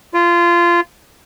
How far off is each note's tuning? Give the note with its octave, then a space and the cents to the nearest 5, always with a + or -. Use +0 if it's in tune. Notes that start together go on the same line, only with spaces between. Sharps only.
F4 -20